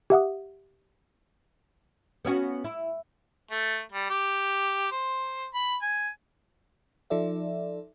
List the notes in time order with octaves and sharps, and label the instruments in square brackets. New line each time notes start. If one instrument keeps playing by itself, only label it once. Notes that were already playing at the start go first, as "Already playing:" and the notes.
[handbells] G4 E5 F#5 D#6
[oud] B3 C#4 F#4
E4
[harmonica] A3
G3
G4
C5
B5
G#5
[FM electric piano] F3 D#4 A4 D5 E5